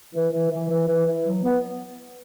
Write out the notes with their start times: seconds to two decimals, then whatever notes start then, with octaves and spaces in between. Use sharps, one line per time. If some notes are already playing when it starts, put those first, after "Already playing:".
0.14 E3
0.32 E3
0.51 E3
0.69 E3
0.88 E3
1.06 E3
1.25 F#3
1.43 B3